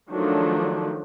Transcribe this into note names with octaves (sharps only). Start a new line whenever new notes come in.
D#3 F3 F#3 A3 D4